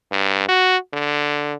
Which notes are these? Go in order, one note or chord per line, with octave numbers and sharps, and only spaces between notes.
G2
F#4
D3